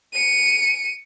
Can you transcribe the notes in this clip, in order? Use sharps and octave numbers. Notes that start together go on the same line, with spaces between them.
C#7 D#7